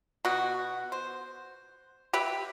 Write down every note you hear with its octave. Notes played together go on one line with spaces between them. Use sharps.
B2 F#4
C5
G4 B4 E5